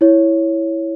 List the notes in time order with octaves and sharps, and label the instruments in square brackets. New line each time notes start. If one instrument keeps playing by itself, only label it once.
[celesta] E4 C#5